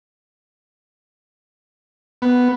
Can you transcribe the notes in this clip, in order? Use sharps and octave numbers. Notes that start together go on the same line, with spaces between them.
B3